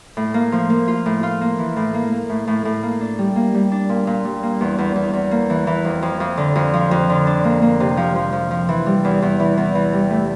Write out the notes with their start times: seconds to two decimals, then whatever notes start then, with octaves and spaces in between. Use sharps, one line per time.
0.17 A2
0.34 A#3
0.52 F3
0.70 A#3
0.88 F4
1.06 A2
1.23 F4
1.41 A#3
1.59 E3
1.76 A2
1.94 A#3
2.12 A#3
2.29 A2
2.48 A2
2.65 A2
2.83 A#3
3.01 D4
3.19 G3
3.36 A#3
3.54 G3
3.72 D4
3.89 A#2
4.07 A#2
4.25 G3
4.43 A#3
4.61 E2
4.78 E2
4.96 E2
5.13 E2
5.31 A#3
5.50 E3
5.67 E3
5.85 F2
6.02 F2
6.20 F2
6.37 D3
6.55 F2
6.73 F3
6.91 F2
7.10 D3
7.27 D4
7.44 A#3
7.62 A#3
7.80 C3
7.97 F3
8.15 F3
8.33 F3
8.51 F3
8.69 E3
8.86 G3
9.05 E2
9.22 E2
9.40 E3
9.57 E2
9.75 E3
9.93 G3
10.10 A3